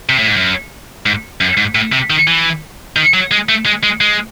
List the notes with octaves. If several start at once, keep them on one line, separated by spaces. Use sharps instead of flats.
C3
A2
G#2
F#2
G#2
F#2
G#2
A2
C3
D#3
E3
D#3
F#3
G#3
A3
G#3
G#3
G#3